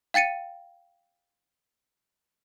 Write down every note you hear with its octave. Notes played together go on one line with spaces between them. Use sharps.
F5 G5 A6 C#7 D#7